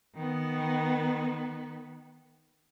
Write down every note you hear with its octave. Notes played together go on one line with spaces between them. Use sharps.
D#3 B3